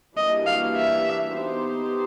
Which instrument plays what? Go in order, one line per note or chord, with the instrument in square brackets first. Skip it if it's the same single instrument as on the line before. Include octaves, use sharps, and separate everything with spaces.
[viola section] E3 G3 A#3 D4 F#4 [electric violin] D#5
[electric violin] F5
E5
[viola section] B3 D#4 G4 C5